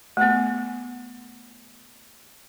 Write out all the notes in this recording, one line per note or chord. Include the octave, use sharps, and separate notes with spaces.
A3 B3